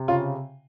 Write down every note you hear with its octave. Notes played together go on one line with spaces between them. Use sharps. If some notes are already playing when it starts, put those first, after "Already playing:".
Already playing: C3
C#3 F4